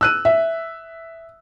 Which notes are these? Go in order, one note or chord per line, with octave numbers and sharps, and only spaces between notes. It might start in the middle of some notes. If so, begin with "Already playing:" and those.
E6 F#6 D#7
E5